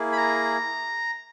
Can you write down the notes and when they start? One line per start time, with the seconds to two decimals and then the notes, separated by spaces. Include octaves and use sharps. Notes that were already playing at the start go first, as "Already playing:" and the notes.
Already playing: A#3 E4 G#4
0.12 B5
0.17 A#5